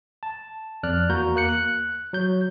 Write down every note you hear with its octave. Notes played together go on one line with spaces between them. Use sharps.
A5
F2 D5 F6 F#6
E2 A#3 F#4 A#5 G6
A#3 F#6 C#7
F#6
F#3 G6